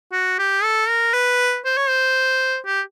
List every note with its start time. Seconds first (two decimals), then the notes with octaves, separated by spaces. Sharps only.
0.12 F#4
0.39 G4
0.64 A4
0.89 A#4
1.14 B4
1.65 C5
1.77 C#5
1.89 C5
2.66 G4